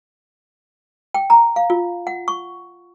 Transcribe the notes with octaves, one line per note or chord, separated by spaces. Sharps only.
G5
A#5
F5
F4
F#5
C#6